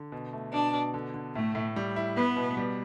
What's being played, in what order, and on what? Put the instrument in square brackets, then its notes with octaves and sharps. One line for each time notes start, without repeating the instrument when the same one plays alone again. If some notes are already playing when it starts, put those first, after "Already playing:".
Already playing: [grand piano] D3
B2
A3
[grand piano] B2 [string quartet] D4
[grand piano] B2
D3
D3
[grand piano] A2 [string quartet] A3
[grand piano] A2
G3
E4
[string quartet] B3 [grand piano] B4
[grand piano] B2
G3